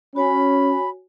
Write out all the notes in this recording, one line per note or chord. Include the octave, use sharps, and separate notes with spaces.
C#4 F#4 C#5 G#5 B5